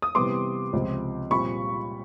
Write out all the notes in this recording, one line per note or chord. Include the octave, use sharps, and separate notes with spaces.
D#6
C3 E3 G3 B3 C6 D6
C#2 C3 F3
A#2 G3 C4 B5 C#6